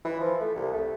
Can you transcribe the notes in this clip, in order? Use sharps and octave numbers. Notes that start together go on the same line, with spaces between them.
E3
F3
A3
C2
A3